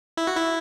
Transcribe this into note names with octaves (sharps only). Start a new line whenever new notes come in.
E4
F#4
E4